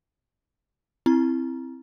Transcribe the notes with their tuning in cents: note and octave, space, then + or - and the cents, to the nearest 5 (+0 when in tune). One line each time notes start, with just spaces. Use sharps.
C4 +0 E4 +0 A#5 +20